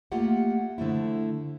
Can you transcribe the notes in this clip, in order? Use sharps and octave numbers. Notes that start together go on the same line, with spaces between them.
A3 A#3 F4 G4 F#5
D3 F3 A3 E4